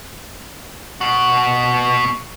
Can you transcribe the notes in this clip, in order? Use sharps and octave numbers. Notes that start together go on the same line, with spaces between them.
B2 F#4